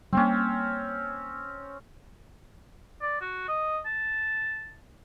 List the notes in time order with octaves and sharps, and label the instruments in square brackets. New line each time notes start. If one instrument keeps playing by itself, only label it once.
[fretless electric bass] G3 G#3 A#3 [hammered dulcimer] C4 C#4
[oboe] D5
F#4
D#5
A5